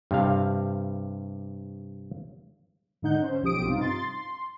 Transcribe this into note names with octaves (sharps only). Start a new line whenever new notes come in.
G2 C3 F5
G#2 D3 D#4 F#5 G6
C#4 C5
B1 F3 G4 D#6 D7
G2 C3 C4 D#4 F4
C6 A6
C6